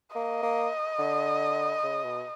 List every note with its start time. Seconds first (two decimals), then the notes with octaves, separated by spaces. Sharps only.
0.15 A#3 D#5
0.43 A#3
0.99 D3
1.83 C#3
2.04 B2